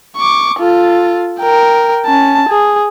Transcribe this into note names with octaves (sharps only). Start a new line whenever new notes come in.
C#6 D6
F4 A4
A#4 G5
C#4 A5
G#4